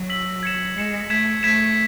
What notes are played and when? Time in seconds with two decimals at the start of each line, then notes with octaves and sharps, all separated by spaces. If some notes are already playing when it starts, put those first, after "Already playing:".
Already playing: F#3
0.09 E6 B6 F#7
0.43 G#6 C#7 E7
0.76 G#3 G#6 C#7 E7
1.10 A3 G#6 B6 E7
1.43 A3 G#6 B6 E7